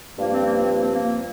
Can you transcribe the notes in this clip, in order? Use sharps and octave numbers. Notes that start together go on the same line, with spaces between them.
G2 F3 A#3
C4
A#3
C4
A#3
C4
A#3